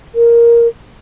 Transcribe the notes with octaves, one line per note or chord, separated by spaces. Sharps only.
A#4